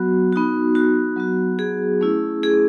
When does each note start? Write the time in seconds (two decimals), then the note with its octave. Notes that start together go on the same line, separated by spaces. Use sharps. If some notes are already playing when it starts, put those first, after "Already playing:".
Already playing: F#3 B3 F#4
0.33 B3 D#4 F#4
0.75 F#4
1.16 F#3 B3 F#4
1.59 G#4
2.01 A3 C#4 E4
2.43 G#4